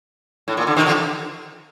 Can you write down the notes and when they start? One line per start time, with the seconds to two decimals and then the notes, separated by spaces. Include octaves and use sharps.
0.48 A2
0.57 A#2
0.67 D3
0.76 C3 D#3
0.86 D3 F3